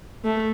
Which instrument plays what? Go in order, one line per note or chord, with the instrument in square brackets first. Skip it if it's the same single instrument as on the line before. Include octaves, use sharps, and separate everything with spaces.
[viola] A3